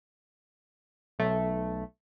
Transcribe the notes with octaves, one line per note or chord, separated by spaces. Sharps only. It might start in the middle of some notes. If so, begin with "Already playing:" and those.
B1 A3